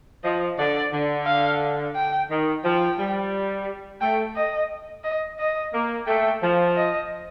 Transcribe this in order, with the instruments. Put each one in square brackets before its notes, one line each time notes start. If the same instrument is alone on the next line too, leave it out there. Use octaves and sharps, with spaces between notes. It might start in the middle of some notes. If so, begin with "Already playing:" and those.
[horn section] F3 [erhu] D#5
[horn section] D3 [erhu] D5
[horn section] D3
[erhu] F5
G5
[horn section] D#3
[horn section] F3 [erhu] G5
[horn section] G3
[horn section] A3 [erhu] G5
[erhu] D#5
D#5
D#5
[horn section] A#3
[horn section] A3 [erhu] G5
[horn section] F3
[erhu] D#5